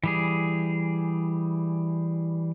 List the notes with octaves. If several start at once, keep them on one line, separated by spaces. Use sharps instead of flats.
E3 G3 G#4